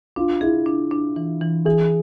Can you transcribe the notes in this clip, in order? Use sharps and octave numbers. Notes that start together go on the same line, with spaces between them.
D4 F4
E4 G#4
D4
D4
E3
E3
E3 G#4